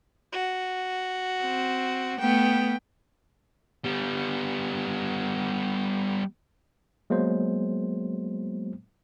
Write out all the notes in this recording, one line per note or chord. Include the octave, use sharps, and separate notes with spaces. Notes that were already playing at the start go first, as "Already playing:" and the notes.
F#4
C4
A3 B3 G5
G3 B3
F#3 G#3 A#3 B3 C5